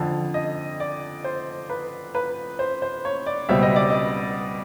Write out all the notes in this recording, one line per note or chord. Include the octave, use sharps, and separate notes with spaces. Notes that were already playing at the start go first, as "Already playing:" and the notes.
Already playing: F2 D3 F3 A5
D#5
D5
C5
B4
B4
C5
C5
C#5
D5
C#2 B2 G3 C4 E5
D#5
D5
D#5